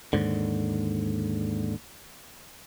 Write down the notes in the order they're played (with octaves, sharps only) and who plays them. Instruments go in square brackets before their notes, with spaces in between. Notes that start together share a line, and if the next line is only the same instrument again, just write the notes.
[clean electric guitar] D#2 G#2 D3